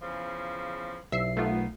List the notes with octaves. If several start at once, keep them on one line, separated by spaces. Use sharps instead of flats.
E2 C#3 F3
B1 E5 C7
D#3 A3 B3 F4